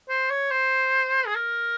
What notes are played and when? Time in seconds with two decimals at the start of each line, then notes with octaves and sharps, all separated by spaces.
0.09 C5
0.30 C#5
0.51 C5
1.27 G#4
1.35 A#4